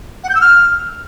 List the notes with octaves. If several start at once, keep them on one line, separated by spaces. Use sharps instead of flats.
F#5
G6
E6
F6